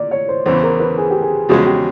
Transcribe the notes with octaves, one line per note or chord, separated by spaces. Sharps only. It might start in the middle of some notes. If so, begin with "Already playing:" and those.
Already playing: A#2 D5
C#5
C5
E2 C#3 E3 C5
A#4
B4
G#4
G4
G#4
E2 C#3 F3 G#3 F#4
G4